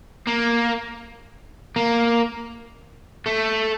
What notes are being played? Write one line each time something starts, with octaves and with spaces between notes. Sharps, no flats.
A#3
A#3
A3